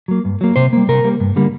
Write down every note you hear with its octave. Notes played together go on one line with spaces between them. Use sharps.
F#3 A#3
G2
F#3 A#3
C3 C5
G3 A#3
C3 A#4
G3 A#3
G2
D3 G3 A#3